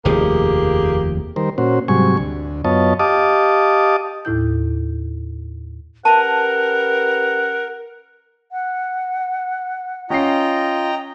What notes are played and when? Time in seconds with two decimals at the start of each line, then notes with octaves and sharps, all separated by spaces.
0.05 F1 D#2 F3 A#3 G4 G#4
1.36 D#3 G3 A#4 C5
1.58 A#2 C#4 F#4 C5
1.88 G#2 C3 F#3 G3 G#5 C#6
2.17 D2
2.64 F#2 B3 F4 C#5 D#5 A5
2.99 G4 D#5 F5 A5 D6 D#6
4.25 D#2 A2 E4 G6
6.05 C#4 G4 A#4 B4 F#5 A5
8.52 F#5
10.10 C#4 F4 D#5 G5 A#5 C7